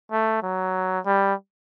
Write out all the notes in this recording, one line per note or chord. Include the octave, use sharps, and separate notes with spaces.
A3
F#3
G3